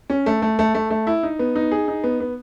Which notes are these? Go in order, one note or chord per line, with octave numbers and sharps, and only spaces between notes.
C#4
A3
A3
A3
A3
A3
E4
D#4
B3
D#4
G#4
D#4
B3
B3